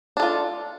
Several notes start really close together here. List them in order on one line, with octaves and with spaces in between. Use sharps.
D4 A4 F4